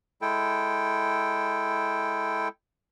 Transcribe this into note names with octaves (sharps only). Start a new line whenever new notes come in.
G#3 E4 A4 G5